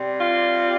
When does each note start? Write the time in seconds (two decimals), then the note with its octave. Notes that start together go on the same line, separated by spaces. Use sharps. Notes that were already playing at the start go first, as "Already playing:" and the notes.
Already playing: C3 G3
0.21 F4